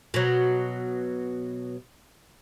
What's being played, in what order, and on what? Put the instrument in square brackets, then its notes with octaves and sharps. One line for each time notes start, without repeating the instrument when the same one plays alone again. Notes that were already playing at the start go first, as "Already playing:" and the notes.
[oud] B2 F#3